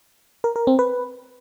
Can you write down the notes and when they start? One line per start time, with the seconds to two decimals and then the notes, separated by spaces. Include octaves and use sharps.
0.44 A#4
0.56 A#4
0.67 C4
0.79 B4